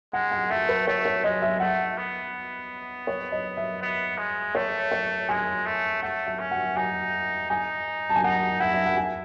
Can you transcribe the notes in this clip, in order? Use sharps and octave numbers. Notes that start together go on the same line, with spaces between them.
G#3 F#5
F#5
A3 E5
B4
A3 C#5
C#5
G#3 D#5
E5
A3 F#5
B3
C#5
D#5
E5
B3
G#3
A3 C#5
C#5
G#3 G#5
A3
A3 F#5
E5
C#4
F#5
D#4 G#5
D#4 G#5
A5
G#5
D#4 F#5
E4 F#5
E5
F#5
G#5